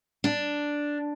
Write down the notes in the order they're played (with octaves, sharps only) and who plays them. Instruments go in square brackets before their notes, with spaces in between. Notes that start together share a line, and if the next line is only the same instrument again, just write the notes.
[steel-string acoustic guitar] D4